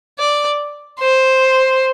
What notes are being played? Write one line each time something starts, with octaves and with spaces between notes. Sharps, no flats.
D5
C5